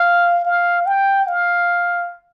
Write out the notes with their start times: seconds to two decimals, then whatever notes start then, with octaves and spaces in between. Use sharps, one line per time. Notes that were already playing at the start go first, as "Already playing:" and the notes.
Already playing: F5
0.45 F5
0.86 G5
1.28 F5